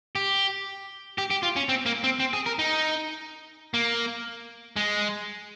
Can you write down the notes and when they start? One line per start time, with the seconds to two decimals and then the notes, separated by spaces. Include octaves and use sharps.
0.15 G4
1.18 G4
1.31 G4
1.43 F4
1.56 C#4
1.69 C4
1.86 A#3
2.04 C4
2.20 C4
2.33 G#4
2.46 A#4
2.59 D#4
3.74 A#3
4.76 G#3